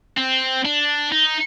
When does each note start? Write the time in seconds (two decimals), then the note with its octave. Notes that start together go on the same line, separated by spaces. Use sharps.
0.18 C4
0.65 D4
1.12 D#4